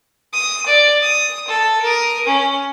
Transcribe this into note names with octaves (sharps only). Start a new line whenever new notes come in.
D#6
D5
D#6
A4
A#4 D#6
C#4